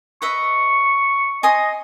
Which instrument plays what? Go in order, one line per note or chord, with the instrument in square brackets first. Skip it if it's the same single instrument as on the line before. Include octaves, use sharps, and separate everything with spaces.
[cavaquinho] B4 D#5 E5 [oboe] C#6
[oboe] D#5 [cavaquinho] G#5 C6 D#6